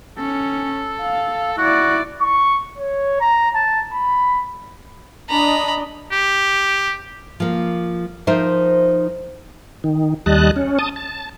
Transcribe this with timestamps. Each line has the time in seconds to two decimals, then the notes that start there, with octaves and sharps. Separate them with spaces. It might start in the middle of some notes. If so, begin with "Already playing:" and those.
0.18 C#4 A4
1.02 F5
1.58 E4 F#4 D5
2.21 C#6
2.78 C#5
3.21 A#5
3.55 A5
3.93 B5
5.30 D4 D#5 A#5 B5
6.12 G4
7.40 F3 A#3
8.27 F3 D#4 A#4 C5 E5
9.84 D#3
10.26 D#2 G3 D#5 A5 F#6
10.56 C#4
10.79 A5 D#6
10.96 A5